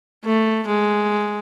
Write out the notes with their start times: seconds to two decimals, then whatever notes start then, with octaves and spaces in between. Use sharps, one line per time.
0.25 A3
0.68 G#3